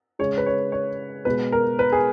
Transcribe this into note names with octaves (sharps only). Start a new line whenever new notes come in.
C#3 G#3 C#5
B4
C#5
C#5
B2 G#3 B4
A#4
B4
G#4